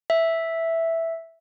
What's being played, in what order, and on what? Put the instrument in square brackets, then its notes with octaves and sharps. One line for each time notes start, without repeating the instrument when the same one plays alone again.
[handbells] E5